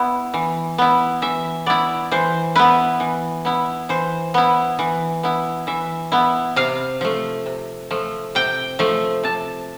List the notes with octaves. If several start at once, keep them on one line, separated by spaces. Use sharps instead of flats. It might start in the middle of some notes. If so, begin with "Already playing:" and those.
Already playing: B3 E4
E3
B3 E4
E3 E5
B3 E4 D5
E3 C5
B3 E4 B4
E3
B3 E4
E3 C5
B3 E4
E3
B3 E4
E3 E5
B3 E4
C3 F5
F3 A3
C3
F3 A3
C3 G5
F3 A3
C3 A5